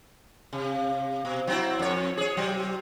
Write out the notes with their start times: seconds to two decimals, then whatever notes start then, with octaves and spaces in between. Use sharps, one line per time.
0.53 C3
1.25 B2
1.47 F#3 C4 E4
1.79 F2 C#5
2.17 G#4 C#5
2.37 C3 F#3